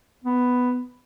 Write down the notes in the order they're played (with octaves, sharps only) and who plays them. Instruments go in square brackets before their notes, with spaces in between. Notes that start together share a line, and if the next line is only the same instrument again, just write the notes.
[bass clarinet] B3